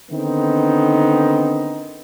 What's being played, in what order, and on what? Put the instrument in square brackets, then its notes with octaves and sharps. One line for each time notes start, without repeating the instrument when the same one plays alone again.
[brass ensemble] D3 D#3 B3 C4 D#4